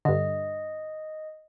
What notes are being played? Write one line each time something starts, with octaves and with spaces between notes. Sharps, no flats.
G2 D3 D#5